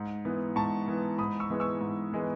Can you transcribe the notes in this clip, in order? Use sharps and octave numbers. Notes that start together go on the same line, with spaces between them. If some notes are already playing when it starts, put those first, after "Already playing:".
Already playing: G#2
E3 B3
G#2 A5 C#6
E3 B3
G#2 B5 D#6
C#6 E6
E3 G#3 B3
C#6 E6
G#2
E3 G#3 B3